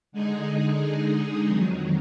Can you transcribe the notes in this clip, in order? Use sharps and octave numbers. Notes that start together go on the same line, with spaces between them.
D3 G#3 D#4 G#4
F2 D#3 F#3